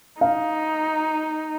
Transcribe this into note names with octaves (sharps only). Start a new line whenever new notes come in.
D#4 F5